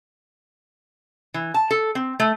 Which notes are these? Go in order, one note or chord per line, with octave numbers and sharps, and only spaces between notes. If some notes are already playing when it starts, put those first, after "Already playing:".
E3
A5
A4
C4
A3